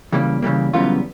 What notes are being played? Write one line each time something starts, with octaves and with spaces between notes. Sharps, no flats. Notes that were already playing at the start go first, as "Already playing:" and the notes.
C#3 E3 G3 A#3
C#3 E3 G3 A#3
F#2 C#3 E3 G3 B3 F4